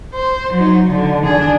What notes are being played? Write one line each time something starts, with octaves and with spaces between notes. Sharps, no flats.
C5
F#3 D#4
D3
D4 G#4